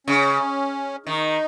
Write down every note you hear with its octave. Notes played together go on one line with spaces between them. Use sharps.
C#3 C#4
D#3 D#4